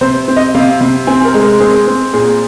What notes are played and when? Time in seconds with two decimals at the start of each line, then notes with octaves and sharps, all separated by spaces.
0.01 C3 C5
0.28 C4
0.36 D#5
0.54 C3 F5
0.81 C3
1.07 C4 G#5
1.25 A#4
1.34 G#3
1.43 A#4
1.60 C4 G#4
1.87 C4
2.13 A#2 G#4